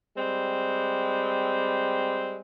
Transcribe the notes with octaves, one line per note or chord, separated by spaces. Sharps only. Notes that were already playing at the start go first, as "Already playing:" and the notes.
G3 G#3 C4